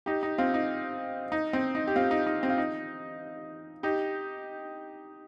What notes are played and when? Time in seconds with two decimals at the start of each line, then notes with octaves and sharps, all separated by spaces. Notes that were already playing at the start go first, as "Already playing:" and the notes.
0.06 D#4 G4
0.23 D#4
0.38 C4 F4
0.54 D#4
1.32 D#4
1.53 C4
1.75 D#4
1.87 G4
1.96 C4 F4
2.11 D#4
2.27 D#4
2.43 C4
2.50 F4
2.58 D#4
3.83 D#4 G4